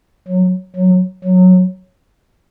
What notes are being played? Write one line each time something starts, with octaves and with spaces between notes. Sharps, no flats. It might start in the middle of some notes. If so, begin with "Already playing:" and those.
F#3
F#3
F#3